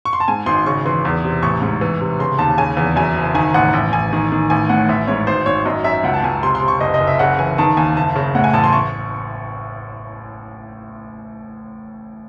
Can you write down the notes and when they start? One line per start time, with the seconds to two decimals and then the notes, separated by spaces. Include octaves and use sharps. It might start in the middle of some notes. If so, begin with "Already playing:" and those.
0.05 C#6
0.13 C6
0.20 A5
0.28 G#2 G#5
0.46 G#1 C6
0.66 C#3 C#6
0.86 E3 C6
1.05 E2
1.24 C3
1.42 A1 C#6
1.62 G#2
1.81 E3
2.01 C3
2.19 C#3 C6
2.38 D#2 A5
2.58 C#3 G#5
2.77 E2
2.96 F#2 G#5
3.16 F#1
3.35 D#3 G#5
3.54 A1 F#5
3.73 A1
3.93 A1 G#5
4.13 D#3
4.32 D#3
4.50 A1 G#5
4.69 A2 F#5
4.89 A1 E5
5.07 G#2 C#5
5.27 G#1 C5
5.46 G#1 C#5
5.66 F#2 D#5
5.84 F#2 E5
6.04 C#2 F#5
6.14 A5
6.23 C#2 G#5
6.43 C3 C6
6.55 C6
6.62 C3
6.68 C#6
6.80 F#1 D#5
6.94 D#5
7.00 F#1
7.07 E5
7.19 C#3 F#5
7.38 E3 G#5
7.58 D#3 A5
7.77 D#2 G#5
7.97 F#1 A5
8.16 C#3
8.35 A2 F#5
8.44 G#5
8.53 A1 A5
8.64 C6
8.73 C#6